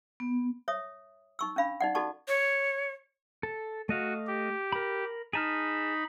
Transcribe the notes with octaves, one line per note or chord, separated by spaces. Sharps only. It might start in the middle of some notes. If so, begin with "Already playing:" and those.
B3
C#5 E5 D#6
D#4 C#6 E6
C#4 D4 F5 B5
D#4 D5 F#5
D#4 F#4 A4 D5 A5 C#6
C#5
A4
A3 F#4 D#5 F5
G4
A#4 B5
D#4 G#4 A5 B5 F6